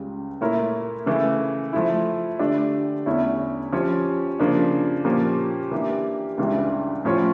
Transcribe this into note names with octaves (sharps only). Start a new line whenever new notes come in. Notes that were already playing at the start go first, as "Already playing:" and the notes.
Already playing: C#2 C#3 G3
A#2 A3 E4 A#4 C#5
C#3 E3 A3
F3 A3 E4
D3 A3 D4 G4 D5
E2 D3 A3 C#4 E4
F3 C#4 G4 C#5
C#3 F3 A#3 D4
A#2 F3 A#3 C#4 G4
E3 A#3 D4 G4
C#2 C#3 E3 G3 D4
A2 F3 C#4 F4 C#5